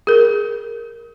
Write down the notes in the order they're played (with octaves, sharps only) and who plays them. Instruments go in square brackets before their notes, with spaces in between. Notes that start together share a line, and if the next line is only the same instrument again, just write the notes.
[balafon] G#4 A#4